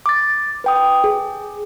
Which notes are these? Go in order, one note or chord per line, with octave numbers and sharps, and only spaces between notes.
D6 A6
B4 G5 D#6
G#4